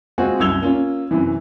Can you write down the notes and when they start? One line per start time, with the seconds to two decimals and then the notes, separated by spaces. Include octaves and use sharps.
0.18 G#3 C4 F4 F#4 G#4
0.40 C2 F#2 E6 G#6 F7 G7
0.61 A#3 C#4 F4
1.11 F#2 C3 E3